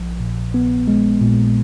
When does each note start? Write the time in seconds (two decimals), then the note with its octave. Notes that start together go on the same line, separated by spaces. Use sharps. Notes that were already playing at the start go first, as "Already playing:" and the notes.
Already playing: A#1 F3
0.20 A#2
0.54 B3
0.88 G#3
1.21 A#2